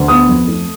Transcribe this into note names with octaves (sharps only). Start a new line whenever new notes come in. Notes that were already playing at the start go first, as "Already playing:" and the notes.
Already playing: D2
B3 D#6
F2
A3